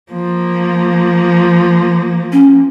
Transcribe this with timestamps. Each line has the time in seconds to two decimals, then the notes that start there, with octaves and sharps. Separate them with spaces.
0.12 F3 A#3
2.33 C#4